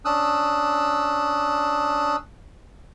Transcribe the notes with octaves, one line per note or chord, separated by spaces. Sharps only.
C#4 D4 D#6 E6 F#6